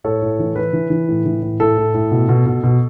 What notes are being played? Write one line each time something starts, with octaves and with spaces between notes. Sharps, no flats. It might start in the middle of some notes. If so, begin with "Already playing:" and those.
A2 A4 C#5
A2
E3
E3 B4
E3
E3
A2
E3
A2
A2 A4
A2
A2
B2
B2
B2
B2